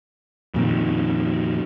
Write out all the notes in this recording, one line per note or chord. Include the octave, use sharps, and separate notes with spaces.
F2 A#2 D#3